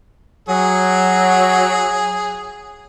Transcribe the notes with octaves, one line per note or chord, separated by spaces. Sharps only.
F#3 G#4